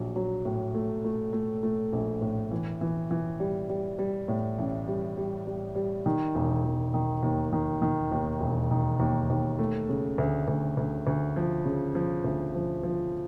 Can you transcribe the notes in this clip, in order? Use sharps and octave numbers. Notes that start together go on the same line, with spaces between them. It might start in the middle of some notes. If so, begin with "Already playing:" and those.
Already playing: A#1 F#3
F#3
A2
A3
A3
A3
A3
A#1
A2
E3
E3
E3
G3
G3
G3
A2
A1
G3
G3
G3
G3
D#3
E1
E1
D#3
D#2
D#3
D#3
D#2
E1
D#3
D#2
D#2
A3
C#3
D2
D2
D2
D2
F3
C#3
F3
D2
F3
F3